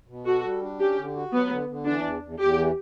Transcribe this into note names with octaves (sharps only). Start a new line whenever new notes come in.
B2
F#4 A4
G3
D4
C#4 G4
D3
F#4
F#3 B3
D3
D3
E3 D4
E2
E2
E2 G4
E3